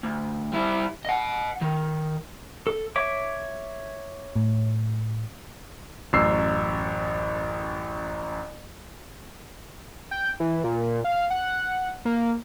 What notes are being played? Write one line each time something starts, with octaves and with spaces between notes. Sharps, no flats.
D2
G3 E4
D#5 F#5
D#3
A4
C#5 E5 D6
A2
A1 F#2 E6 C7
G5
E3
A#2
F5
F#5
A#3